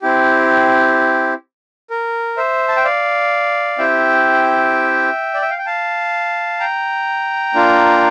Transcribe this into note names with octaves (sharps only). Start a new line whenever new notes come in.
C4 E4 G4
A#4
C5 E5
A5
G5
D5 F5
C4 E4 G4 E5 G5
D5
E5
F5
G5
F5 A5
G5 A#5
A#3 D4 F4